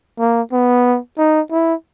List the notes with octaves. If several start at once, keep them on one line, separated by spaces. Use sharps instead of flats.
A#3
B3
D#4
E4